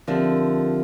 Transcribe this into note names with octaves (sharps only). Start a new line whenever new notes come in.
D3 F3 C4 G4 A#4 E5